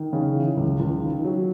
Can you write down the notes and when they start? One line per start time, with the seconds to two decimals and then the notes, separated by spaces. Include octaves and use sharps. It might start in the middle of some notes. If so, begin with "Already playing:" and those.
Already playing: D#3
0.13 C#3
0.35 E3
0.57 C#2
0.80 C#2
1.02 D#3
1.25 F#3